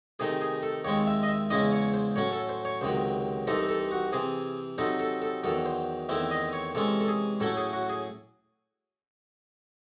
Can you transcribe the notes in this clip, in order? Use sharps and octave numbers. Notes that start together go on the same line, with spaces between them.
C3 D#3 A3 D#4 G#4
G#4
A4
D#2 D#3 G#3 C4 C#5
E5
D#5
E5
E2 C#3 G#3 C#4 E4 D#5
C#5
C5
A2 F#3 C#4 C#5
A4
C5
C#5
C#2 C3 D#3 F#3 C5
C2 C3 E3 C4 D#4 A4
A4
F#4
C3 E3 C4 G#4
C3 F#3 C4 D#4 A4
A4
A4
E2 D#3 F#3 A4
C5
E2 D#3 A3 C4 E4 E5
D#5
C#5
C3 E3 G#3 C#4 A4
A4
G#4
A2 F#3 A3 C#4 E4 A4
G#4
F#4
G#4